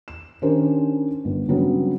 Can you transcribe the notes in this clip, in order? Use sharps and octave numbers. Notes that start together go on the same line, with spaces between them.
E7
D#3 C#4 D4 G4 A#4 C5
G1
C#3 F#3 G3 B3 C4 D4